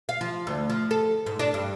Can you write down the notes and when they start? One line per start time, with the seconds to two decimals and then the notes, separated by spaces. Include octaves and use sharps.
0.09 F5
0.21 F3
0.47 D2
0.70 F3
0.91 A4
1.26 G#2
1.39 D4
1.54 G2